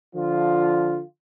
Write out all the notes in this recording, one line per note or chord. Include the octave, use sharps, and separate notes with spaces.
D3 F3 F4